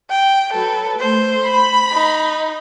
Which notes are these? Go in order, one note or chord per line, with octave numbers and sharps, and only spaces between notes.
G5
F#3 A4 B4
A3 C5
B5
D#4